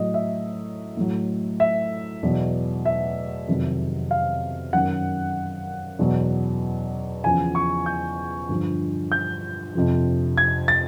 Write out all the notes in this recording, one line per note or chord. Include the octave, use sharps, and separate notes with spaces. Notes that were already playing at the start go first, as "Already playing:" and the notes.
Already playing: A2 F#3 D#5
E5
A2 F#3
E5
E2 B2 F#3
E5
F2 C3 D#3 F#3
F5
F#2 D#3 F#3 F#5
E2 B2 F#3
E2 C#3 F3 G#5
C#6
G6
G2 D3 F3
G6
F2 C3 F3
G#6
A6